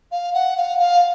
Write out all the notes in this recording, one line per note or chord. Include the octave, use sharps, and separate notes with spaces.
F5
F#5
F5
F5